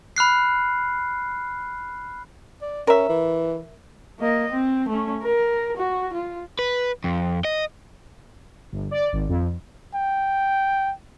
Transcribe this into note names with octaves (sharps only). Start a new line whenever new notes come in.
B5 F6 F#6 C7
D5
C#4 A#4 E5
E3
A#3 D#5
C4
A3 C#4
A#4
F#4
F4
B4
F2
D#5
G1
D5
G#1
F2
G5